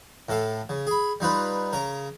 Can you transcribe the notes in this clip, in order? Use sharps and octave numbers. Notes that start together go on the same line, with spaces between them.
A2 A4 F5
C#3
G#4 B5
G3 D#4 F4 B4
C#3 A#4 A#5